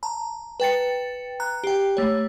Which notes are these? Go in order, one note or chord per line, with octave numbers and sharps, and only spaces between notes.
A5 A#5
B4 G5 A6 C#7
A#5 F#6
G4 G5
A3 C#5